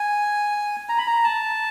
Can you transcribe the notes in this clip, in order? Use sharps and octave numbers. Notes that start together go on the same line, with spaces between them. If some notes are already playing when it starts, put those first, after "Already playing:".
Already playing: G#5
A#5
B5
A#5
A5